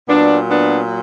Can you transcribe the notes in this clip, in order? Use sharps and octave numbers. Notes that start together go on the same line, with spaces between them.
A#2 F#3 B3 D4
B3 D4